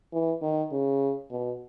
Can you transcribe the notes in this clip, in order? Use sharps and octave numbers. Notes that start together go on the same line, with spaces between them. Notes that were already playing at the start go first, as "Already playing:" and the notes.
E3
D#3
C#3
B2